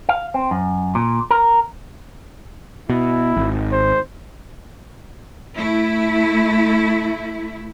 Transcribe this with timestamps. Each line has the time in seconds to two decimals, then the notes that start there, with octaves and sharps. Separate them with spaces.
0.09 F5
0.34 C4
0.51 F#2
0.95 A#2
1.31 A#4
2.90 B2 E4
3.37 G#1
3.73 C5
5.56 A3 E4